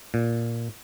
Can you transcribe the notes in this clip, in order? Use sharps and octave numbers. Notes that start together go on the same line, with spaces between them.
A#2